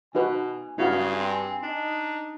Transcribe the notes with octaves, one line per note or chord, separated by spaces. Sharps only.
B2 D#4 F#4 B4 G#5
G2 C#3 E4 F#4 F5
C4
D4 D#4